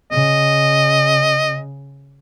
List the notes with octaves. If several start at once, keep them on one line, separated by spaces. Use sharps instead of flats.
C#3 D#5